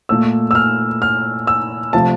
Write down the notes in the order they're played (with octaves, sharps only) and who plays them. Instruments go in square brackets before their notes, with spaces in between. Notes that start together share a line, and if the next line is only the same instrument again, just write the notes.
[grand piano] A#2 A3 E6
E6
F6
F6
E6
C3 F3 A3 A5